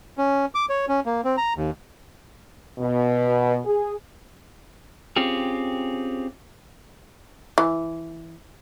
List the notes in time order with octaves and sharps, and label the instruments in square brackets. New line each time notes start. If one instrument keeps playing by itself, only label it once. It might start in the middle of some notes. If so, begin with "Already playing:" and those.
[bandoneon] C#4
D6
C#5
C#4
A#3
C4
A#5
D#2
[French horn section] B2
G#4
[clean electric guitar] C4 C#4 F4 G4 G#4
[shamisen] E3